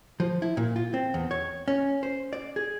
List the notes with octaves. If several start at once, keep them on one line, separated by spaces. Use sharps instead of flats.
F3
E4
A#2
F4
C4
E2
C#5
C#4
C5
D5
G#4